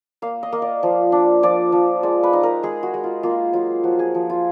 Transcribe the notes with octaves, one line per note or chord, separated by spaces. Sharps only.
A#3 F5
D#5
A#3
D5
F3
D4
F3 D5
F3
G#3 D5
B4
D#4
A#4
G#3 G#4
F#4
G#3
F4
A#3 F4
F#3 F4
F3 F#4
G#4
F3
F4